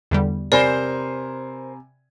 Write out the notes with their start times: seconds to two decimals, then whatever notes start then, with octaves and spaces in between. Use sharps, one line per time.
0.11 E2 D3 G3
0.52 C3 A#4 C5 D5 G#5 B5